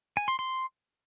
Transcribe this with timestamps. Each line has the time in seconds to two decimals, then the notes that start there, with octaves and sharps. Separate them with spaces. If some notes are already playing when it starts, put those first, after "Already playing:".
0.17 G#5
0.28 C6
0.39 C6